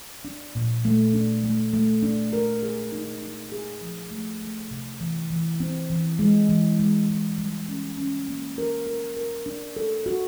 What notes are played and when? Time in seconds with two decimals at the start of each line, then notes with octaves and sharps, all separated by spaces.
0.25 D4
0.55 A#2
0.85 A3
1.14 D4
1.44 A3
1.73 A3
2.03 D4
2.33 A#4
2.63 G#4
2.92 D#4
3.22 D#4
3.52 G#4
3.81 F3
4.11 A3
4.41 A3
4.71 C3
5.00 E3
5.30 E3
5.60 C4
5.90 E3
6.19 G#3
6.49 E3
6.79 G#3
7.09 G#3
7.38 G3
7.68 C#4
7.98 C#4
8.28 A#3
8.58 A#4
8.87 A#4
9.17 A#4
9.46 D4
9.76 A4
10.06 F#4